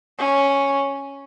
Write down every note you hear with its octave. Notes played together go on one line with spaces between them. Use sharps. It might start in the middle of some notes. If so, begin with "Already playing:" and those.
C#4